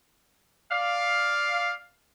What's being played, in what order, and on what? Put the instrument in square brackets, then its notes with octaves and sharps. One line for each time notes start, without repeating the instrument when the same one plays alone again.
[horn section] D5 F5